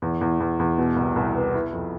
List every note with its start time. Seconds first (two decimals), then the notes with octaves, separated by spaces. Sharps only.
0.02 E2
0.21 E2
0.40 E2
0.60 E2
0.78 B2
0.97 C2
1.16 C2
1.35 B3
1.54 E4
1.73 F2